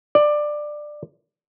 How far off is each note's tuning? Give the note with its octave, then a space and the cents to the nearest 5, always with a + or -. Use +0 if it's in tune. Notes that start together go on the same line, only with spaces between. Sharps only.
D5 +15